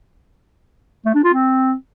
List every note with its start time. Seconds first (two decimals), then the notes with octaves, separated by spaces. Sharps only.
1.05 A3
1.15 D4
1.24 F4
1.33 C4